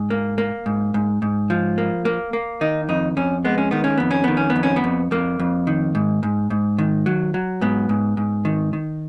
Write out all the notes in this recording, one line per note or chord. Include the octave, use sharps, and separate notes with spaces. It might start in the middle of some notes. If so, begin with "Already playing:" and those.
Already playing: G#2
A#3
A#3
G#2
G#2
G#2
F3
A#3
A#3
A#3
D#3 D#4
F2 D#4
F2 C#4
G#3 B3
C#4
D#3 B3
C#4
F2 B3
C#4
D#3 B3
C#4
B3
F2
C#4
B3
F2
F2 A#3
F2
D#3
G#2
G#2
G#2
D#3
F#3
F#3
G#2 B3
G#2
G#2
D#3
D#3